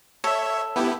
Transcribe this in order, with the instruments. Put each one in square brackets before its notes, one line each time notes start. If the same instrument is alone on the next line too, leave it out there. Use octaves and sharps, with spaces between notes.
[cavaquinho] A4 [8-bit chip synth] C#5 E5
[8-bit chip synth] B3 E4 G4